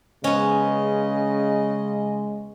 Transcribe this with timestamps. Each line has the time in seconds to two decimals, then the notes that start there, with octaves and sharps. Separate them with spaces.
0.24 C#3 G#3 B3 C#4 D#5